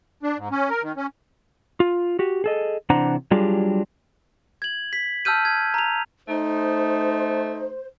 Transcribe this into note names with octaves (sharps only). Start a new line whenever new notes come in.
D4
G#2
C#4
A#4
D#3
C#4
F4
F#4 G4
G#4 A4 D#5
C3 E3 D4 C5 F#5 A#5
F#3 G3 D4 F4 G4 G#4
G#6 F#7
B6
A5 E6 F6 G6 D#7
G#6
A#5 F7
A3 D#4 C5